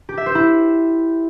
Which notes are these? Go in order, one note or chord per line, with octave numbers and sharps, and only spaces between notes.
G4
E5
C5
E4